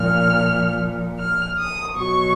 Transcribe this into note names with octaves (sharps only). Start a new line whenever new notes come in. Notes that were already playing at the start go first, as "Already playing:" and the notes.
Already playing: A#2 F3 F6
F6
D#6
B2 F#3 C#6